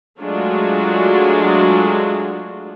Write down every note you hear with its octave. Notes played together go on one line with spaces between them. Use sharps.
F#3 G#3 A3 D4 F4 F#4